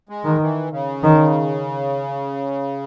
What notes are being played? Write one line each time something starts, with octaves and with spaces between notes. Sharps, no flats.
G#3
D#3
E3
C#3
D#3